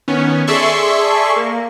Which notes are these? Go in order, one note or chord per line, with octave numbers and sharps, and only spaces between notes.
D#3 B3 C#4
G#4 A4 D5 E5 C6 C#6
A#3